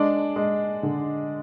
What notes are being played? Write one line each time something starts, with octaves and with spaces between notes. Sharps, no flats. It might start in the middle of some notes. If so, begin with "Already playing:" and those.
Already playing: G#3 D4 D5
G#3
D3